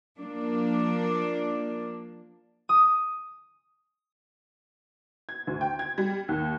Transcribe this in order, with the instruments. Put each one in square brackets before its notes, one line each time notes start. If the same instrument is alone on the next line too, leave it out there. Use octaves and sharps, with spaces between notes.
[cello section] F3 A#3 D4
[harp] D#6
[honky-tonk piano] G#6
D2
G5
G#6
G3
D#2